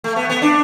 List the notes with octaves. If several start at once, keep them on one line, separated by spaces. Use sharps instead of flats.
A3
B3
B3
D4